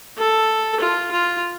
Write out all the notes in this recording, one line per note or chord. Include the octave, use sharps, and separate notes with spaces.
A4
F4
F4